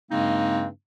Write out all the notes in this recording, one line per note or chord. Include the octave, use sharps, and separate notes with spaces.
G2 C#3 G#3 A#3 C4 D#4